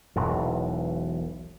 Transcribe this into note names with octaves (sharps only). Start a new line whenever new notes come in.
E1 B1 E2